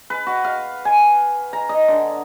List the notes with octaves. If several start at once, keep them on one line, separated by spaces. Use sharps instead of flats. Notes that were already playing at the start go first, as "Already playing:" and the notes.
B4
F#4
F5
G#5
A#5
D#5
D3